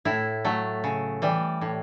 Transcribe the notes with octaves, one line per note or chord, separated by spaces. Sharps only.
A2 E4
F#3 A3
C#3
E3 G3
A2